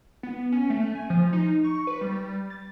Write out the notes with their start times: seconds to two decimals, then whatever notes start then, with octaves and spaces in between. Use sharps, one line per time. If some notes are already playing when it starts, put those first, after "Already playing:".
0.23 B3
0.52 C#4
0.70 A3
0.95 G#5
1.10 F3
1.33 D#4
1.64 C#6
1.87 B4
2.01 G3
2.50 A6